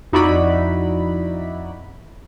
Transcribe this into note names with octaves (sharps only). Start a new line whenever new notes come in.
F2 D#4 E4 F#4 D5 B5